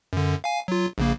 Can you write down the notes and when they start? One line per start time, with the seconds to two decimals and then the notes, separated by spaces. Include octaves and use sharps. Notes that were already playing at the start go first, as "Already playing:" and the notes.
0.13 F#2 D3
0.44 F5 G#5
0.68 F#3 F4
0.98 A#1 C#3 A#3